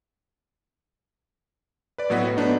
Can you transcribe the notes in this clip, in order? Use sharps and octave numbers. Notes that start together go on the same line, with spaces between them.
B4 D5
A2 F#3 B3 F#4 D#5 B6
A3 B3 D4 D#4